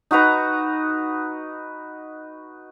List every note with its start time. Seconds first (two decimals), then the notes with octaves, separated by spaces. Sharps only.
0.11 D#4 F#4 B4 A#5